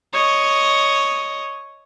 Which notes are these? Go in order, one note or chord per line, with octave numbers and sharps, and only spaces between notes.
C#5 D#5